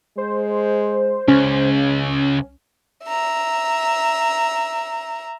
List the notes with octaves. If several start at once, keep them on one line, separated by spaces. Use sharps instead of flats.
G#3 C5
C#2 C#3 C#4
E5 A#5